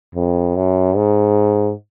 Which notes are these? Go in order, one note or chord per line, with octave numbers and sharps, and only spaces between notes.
F2
F#2
G#2